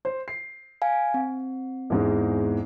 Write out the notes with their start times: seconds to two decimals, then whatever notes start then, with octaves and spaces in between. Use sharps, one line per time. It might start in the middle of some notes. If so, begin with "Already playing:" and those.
0.05 C5
0.28 C7
0.82 F5 G#5
1.14 C4
1.90 E2 G#2 G#3